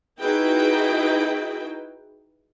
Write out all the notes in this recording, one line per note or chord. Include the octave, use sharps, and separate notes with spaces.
D#4 E4 F#4 G#4 B4 G5